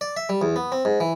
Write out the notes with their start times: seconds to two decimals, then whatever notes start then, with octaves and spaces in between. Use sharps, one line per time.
0.01 D5
0.17 E5
0.29 G3
0.41 E2
0.56 B3
0.72 C4
0.85 G#2
1.00 E3